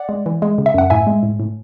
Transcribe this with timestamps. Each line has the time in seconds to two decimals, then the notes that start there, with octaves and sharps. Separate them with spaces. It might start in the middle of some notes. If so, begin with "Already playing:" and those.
Already playing: D5 F#5
0.09 G#3
0.26 E3
0.42 G#3
0.58 C#3
0.66 E5
0.74 F#2 F#5
0.90 A2 E5 G#5
1.07 G#3
1.23 A2
1.40 A2